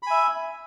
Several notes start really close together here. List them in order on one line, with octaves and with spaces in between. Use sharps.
B5 G#5 E5